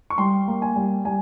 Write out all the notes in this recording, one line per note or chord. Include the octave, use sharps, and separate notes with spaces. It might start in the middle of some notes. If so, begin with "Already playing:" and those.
C#6
G3 C6
A#3
G#5
G3
G3 G#5